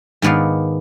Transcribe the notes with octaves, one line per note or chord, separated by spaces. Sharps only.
G#2 D#3 B3 D5 F5